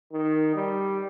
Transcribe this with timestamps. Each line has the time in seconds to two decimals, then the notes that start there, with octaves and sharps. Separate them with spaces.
0.13 D#3
0.55 G3